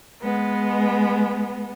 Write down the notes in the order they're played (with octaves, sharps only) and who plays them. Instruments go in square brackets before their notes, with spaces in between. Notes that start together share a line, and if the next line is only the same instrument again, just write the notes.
[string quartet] G#3 B3